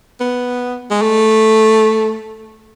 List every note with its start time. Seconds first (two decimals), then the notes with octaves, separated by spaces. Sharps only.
0.20 B3
0.90 G#3
1.02 A3